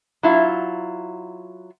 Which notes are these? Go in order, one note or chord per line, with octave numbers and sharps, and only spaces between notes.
F#3 E4 F4